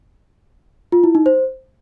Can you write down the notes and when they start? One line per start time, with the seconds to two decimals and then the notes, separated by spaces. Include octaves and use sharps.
0.92 F4
1.04 E4
1.15 D#4
1.26 C5